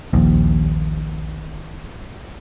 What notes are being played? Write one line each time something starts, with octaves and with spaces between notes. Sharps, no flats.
A#1 D#2